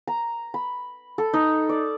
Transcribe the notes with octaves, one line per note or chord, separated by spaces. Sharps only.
A#5
B5
A4
D#4
D5